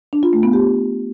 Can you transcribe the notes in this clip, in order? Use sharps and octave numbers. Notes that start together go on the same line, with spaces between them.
D4
F4
A3
B3
G4